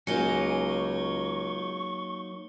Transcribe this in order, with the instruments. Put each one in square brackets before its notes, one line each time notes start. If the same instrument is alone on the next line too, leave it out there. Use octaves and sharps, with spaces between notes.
[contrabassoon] C#2 [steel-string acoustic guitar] F#3 A#3 D#4 [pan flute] G#5 [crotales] C#7 G7
[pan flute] C#6